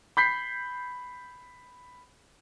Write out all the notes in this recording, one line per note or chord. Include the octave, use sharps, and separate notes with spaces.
B5 G6 B6 C7